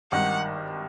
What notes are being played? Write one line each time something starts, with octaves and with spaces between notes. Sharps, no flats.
G#1 G2 D#3 F#5